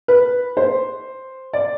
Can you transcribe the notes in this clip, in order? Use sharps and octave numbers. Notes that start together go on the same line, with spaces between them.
B4
C5
D5